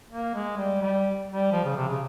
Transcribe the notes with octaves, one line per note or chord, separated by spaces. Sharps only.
A#3
G#3
G3
G3
G3
F3
C#3
C3
C#3